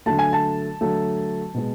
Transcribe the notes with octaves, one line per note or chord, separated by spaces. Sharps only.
D3 F#3 A3 A5
G#5
A5
D3 F#3 A3
B2 G#3 B3